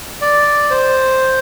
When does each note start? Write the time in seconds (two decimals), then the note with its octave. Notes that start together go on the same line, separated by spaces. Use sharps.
0.21 D5
0.70 C5